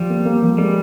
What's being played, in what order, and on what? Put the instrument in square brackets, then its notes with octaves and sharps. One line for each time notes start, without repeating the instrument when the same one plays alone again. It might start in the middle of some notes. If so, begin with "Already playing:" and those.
Already playing: [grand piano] F3 [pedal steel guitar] G3
[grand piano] A#3
A#3
F3
[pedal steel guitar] G3 [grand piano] G#3